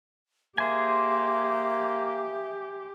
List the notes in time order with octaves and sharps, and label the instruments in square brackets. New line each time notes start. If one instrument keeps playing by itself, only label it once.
[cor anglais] A#3 [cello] G4 [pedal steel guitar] G#4 C5 G#5 [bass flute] E5